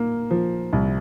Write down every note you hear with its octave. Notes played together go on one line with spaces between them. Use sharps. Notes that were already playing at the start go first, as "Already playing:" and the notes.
Already playing: A#2 A#3
F3
C2